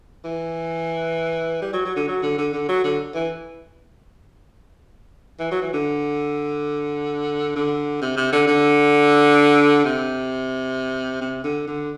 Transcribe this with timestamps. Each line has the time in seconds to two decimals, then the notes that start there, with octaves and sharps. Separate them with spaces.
0.24 E3
1.62 G3
1.73 F#3
1.85 F#3
1.96 D3
2.08 F#3
2.23 D3
2.38 D3
2.53 D3
2.69 F#3
2.84 D3
3.14 E3
5.39 E3
5.51 F#3
5.62 E3
5.73 D3
7.56 D3
8.01 C3
8.17 C3
8.32 D3
8.47 D3
9.85 C3
11.21 C3
11.44 D3
11.67 D3